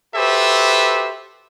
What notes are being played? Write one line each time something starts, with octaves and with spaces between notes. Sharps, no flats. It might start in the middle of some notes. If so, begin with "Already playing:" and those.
F#4 G4 A4 B4 C5 E5